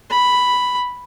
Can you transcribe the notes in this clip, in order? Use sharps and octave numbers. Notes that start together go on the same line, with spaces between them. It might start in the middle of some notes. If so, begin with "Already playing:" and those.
B5